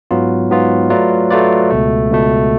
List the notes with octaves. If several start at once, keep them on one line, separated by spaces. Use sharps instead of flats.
G#2 F#3 B3 F4
G#2 F#3 B3 F4
F#3 A3 F4 B4 D5
F#3 A3 F4 B4 D5
C#2 B2 A3
C#2 B2 A3